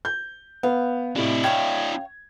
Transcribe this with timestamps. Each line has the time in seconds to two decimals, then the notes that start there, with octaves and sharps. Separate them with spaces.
0.05 G6
0.63 B3 F5
1.16 A2 C3 D4 E4
1.44 C#5 F5 G5 G#6